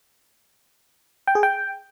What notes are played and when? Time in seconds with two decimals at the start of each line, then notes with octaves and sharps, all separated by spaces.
1.27 G5
1.35 G#4
1.43 G5